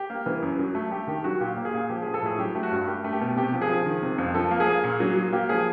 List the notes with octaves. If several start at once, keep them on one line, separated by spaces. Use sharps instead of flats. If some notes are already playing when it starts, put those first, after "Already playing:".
Already playing: G4
A#3
E3
F#2
F#3
A3
A3 G4
D#3 G4
F#3 F#4
A#2 G4
A#3
G#4
A#2
F3 G4
F3 G#4
A4
A2 G#4
F#3 G4
A3
F#4
G2
A3 G4
A3
G4
B2
C3 G4
F3
G#4
F3
D#3
C3
F2
F3 A4
A#3
G#4
A#3
A#2
F#3
F#3
A#3 G4
F3 G#4